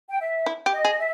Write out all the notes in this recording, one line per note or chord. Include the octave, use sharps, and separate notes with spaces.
G5
E5
E4
G4
D#5
G#4
E5